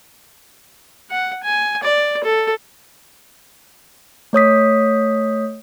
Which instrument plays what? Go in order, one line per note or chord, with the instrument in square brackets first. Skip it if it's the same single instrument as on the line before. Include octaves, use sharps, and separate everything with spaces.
[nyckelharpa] F#5
G#5
D5
A4
[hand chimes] A3 C#5 D#6 B6